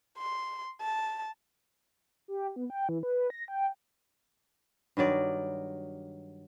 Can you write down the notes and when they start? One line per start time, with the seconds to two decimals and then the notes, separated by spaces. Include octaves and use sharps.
0.18 C6
0.81 A5
2.28 G4
2.56 B3
2.70 G5
2.89 E3
3.03 B4
3.30 A#6
3.48 G5
4.97 G2 D#3 F#3 D5